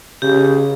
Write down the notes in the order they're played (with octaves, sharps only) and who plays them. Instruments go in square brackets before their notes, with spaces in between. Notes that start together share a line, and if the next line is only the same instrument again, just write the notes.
[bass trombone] C#3 [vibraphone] G4